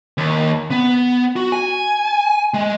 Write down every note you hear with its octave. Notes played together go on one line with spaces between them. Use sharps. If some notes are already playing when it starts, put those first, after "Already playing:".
D#2
B3
F#4
G#5
G#3